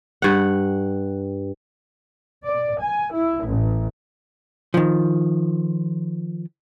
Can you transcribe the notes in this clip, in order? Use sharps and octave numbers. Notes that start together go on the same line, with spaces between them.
G2 F#5
D5
G#5
E4
A1
D#3 F3